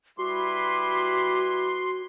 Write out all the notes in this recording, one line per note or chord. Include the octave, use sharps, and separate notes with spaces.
G3 E4 F#4 B4 C6 D6